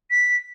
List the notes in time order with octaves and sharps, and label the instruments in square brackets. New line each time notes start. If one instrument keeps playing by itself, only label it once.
[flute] B6